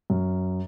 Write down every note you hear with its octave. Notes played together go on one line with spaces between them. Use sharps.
F#2